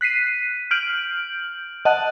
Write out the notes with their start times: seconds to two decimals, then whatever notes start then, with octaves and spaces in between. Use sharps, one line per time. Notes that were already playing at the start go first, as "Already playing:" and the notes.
0.01 F#6 B6 C7 D#7
0.71 F6 G6 D7 F#7
1.85 D#5 F#5 A5 F#6